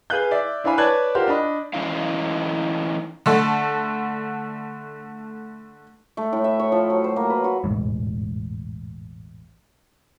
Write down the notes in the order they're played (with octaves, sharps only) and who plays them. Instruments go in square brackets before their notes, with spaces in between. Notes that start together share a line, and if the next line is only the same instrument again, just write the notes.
[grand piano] G#4 B4 F5 F#6 G6
D5 E5
D4 E4 C5 F5 G#5 B5
B4 C#5 D5 A5 F#6 G#6
F4 G4 A#4 C5 F5 F#5
D4 D#5 B5
[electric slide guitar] E3 C#4 D#4 E4 F5
[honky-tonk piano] D3 A3 A5
[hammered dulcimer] A3
A2
E5
C#5
F3
F#3
C5
A#3
B4
F#4
[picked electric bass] E1 A1 G#2